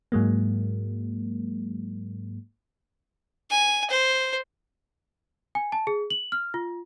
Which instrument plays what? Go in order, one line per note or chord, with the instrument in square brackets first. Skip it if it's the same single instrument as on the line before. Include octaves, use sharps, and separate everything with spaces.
[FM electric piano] G#2 F#3 G#3 A#3
[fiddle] G#5
C5
[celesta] G#5
A5
G#4
F#7
F6
F4